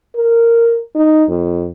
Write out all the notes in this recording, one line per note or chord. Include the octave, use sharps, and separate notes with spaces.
A#4
D#4
F2